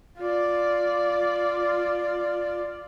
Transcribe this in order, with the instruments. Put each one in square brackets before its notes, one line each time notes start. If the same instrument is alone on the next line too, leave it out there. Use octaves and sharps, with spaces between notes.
[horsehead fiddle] F4 D5